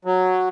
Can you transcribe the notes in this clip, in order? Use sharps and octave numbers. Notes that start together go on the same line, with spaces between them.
F#3